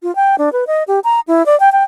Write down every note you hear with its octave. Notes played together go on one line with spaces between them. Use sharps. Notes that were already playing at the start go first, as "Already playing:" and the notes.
F4
G5
D4
B4
D#5
G4
A#5
E4
D5
G5
G5